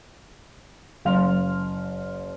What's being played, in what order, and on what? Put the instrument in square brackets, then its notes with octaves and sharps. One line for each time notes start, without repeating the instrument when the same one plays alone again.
[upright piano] F#1 F5 C6 F6 F7